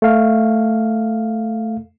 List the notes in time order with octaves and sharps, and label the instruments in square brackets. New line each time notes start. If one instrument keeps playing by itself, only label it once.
[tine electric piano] A3 F5